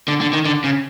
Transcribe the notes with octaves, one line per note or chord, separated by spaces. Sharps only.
D3
D3
D#3
D3
C#3